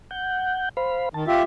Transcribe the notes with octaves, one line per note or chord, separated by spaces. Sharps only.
F#5 G6
C5 F5 B5
D#3 A5
F4 G4 E5